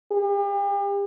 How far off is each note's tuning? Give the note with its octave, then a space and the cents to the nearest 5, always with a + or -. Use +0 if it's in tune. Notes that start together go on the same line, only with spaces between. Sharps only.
G4 +40